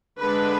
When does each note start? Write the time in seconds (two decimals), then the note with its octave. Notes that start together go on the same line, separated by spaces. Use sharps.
0.19 D3 G#3 D4 B4